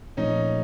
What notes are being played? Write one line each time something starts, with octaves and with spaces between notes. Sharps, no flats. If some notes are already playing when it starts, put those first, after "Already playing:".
A#2 F3 A3 C#4 D#4